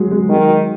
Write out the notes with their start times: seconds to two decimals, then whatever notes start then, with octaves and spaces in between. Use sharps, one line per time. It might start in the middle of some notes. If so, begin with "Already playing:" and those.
Already playing: F#3 G#3
0.11 F#3 G#3
0.29 D#3 F#3 G#3